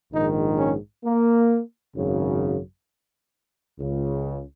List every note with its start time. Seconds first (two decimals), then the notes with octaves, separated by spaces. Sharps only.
0.12 A#1 G#2 D#3 D#4
0.58 C#4
1.04 A#3
1.95 G#1 F#2 C#3
3.78 C#2 C#3